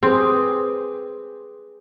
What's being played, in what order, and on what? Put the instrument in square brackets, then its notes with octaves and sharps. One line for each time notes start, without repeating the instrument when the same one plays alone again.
[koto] C4 [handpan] G4 G#4 B4